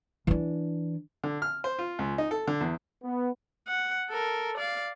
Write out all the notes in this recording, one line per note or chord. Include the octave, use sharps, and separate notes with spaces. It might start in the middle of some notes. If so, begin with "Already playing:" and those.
E3 D4
D3
F6
C5
F4
C#2
D#4
A4
D3
E2
B3
F#5
A4 A#4
D5 F5